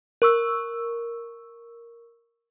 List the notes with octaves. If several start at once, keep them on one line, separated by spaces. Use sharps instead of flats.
A#4 C#6 E6